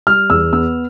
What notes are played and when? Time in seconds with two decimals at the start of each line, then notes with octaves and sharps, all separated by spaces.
0.07 G3 F6
0.30 E2 E6
0.53 B3 E6